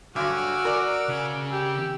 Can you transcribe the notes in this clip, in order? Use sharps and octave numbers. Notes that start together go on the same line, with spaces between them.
G2 D3 F#3 F#4 G#5 D6 E6 F6
A#4 D5
C#3 G#5
G4 E6